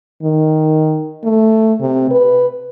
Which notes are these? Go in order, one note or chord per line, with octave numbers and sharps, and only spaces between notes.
D#3
A3
C3
B4